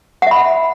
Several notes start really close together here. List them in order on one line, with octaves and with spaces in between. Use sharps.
F#5 E5 B5